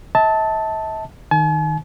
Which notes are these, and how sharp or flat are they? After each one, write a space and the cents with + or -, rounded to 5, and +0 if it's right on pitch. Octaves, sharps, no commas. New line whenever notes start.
E5 -45 A5 +0
D#3 +0 G#5 +45